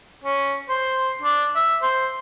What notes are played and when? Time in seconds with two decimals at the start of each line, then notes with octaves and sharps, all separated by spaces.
0.24 C#4
0.69 C5
1.22 D4
1.56 E5
1.82 C5